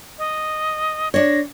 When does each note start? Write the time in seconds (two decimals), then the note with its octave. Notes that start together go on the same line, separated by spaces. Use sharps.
0.19 D#5
1.14 D4 C#5 A#6